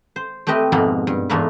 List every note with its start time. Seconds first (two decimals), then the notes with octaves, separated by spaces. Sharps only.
0.16 C5
0.47 A3 C4 G4 B4 D#5
0.72 F2 G#2 B2 A#3 D#4 B5
1.07 G2
1.30 E2 G#2 A3 A#3 B4